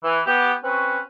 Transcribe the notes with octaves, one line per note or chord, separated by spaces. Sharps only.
E3
B3 G4
C4 C#4 F#4 B4